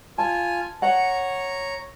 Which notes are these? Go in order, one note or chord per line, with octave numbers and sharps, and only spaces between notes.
F4 G#5 A5
C#5 F#5 A#5